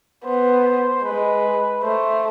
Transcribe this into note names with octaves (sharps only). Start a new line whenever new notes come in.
B3 C5
G#3 B4
A3 C5